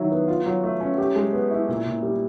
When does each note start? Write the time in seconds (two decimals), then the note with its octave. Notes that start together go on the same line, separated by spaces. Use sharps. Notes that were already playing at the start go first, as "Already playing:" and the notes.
Already playing: D#3 F#3 E4
0.11 B3
0.28 F4
0.46 F#3
0.64 A3
0.81 C#4
0.98 G4
1.16 G#3
1.33 B3
1.50 E4
1.68 A#2
1.86 A#2
2.03 G3